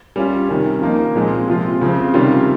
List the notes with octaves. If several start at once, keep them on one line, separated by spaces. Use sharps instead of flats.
G3 C#4 F4
C3 D#3 G3 C#4
F3 A#3 D#4
A#2 F3 G#3 C4
C3 F3 C4 F4
C#3 F3 C4
C3 D#3 G3 C#4 F4